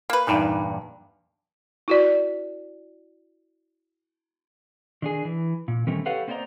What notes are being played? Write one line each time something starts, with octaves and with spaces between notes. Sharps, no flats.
A#3 B4
E2 G2 A#2 D#4
E4 F#4 D5
D#3 D4 G#4
E3
A#2
D#3 G3 A3 C4 C#4
G4 A4 B4 C#5 F5 F#5
A#3 C4 C5 D5 D#5 A#5